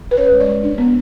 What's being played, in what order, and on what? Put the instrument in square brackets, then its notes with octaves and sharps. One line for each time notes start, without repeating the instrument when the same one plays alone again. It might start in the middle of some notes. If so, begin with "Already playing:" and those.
[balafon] B4
C#4 C#5
G#3
D5
G#3
D4
B3